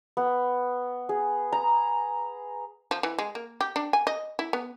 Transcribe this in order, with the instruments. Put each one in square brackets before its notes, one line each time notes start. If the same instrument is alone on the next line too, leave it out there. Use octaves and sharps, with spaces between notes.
[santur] B3
G#4
A#5
[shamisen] F3
E3
G#3
A#3
G4
D4
G#5
D#5
E4
B3